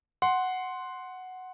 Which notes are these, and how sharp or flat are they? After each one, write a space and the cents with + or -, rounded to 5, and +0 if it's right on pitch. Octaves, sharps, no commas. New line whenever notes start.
F#5 +0 C6 +0